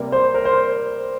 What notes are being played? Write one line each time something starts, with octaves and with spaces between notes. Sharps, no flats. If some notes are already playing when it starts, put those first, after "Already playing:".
Already playing: C3 G3 A#3
C5
A#4
C5